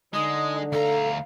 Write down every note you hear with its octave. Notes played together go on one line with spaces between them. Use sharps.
D3 G#3 D#4 D#6
D2 A4 F5 A#5